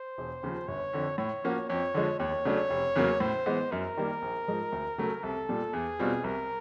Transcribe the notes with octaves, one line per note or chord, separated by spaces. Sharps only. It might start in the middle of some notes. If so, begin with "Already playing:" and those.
Already playing: C5
E1
D#2 C#3 F3
G1 C#5
F2 D3
A2 C#5
F3 A#3 C#4 F#4
F2 C#5
D3 F3 G#3
D#2 C#5
C#3 F#3 A3 D4
F1
E2 C#3 F#3 A#3
A2 C5
E3 G#3 B3
F#2 A#4
D#3 G3 A#3
A#1
G#2 F3 G#3
D2
C#3 F#3 A3
C2 A4
A#2 G3
E2 G#4
B2 G3 C4 F4
C2 A#4